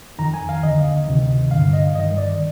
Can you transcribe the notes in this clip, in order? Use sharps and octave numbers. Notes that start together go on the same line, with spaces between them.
F2 D#3 A#5
G#5
F5
D#2 D3 D#5
D2 C3 D#3
G2 D3 F5
D#5
G2 D#3 D#5
D5